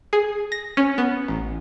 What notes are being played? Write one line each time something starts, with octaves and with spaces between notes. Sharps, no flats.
G#4
A#6
C#4
B3
A1